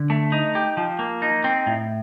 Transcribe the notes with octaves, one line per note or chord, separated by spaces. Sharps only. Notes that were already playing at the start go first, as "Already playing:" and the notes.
Already playing: D3
A3
D#4
G4
F3
A#3
D#4
C4
A2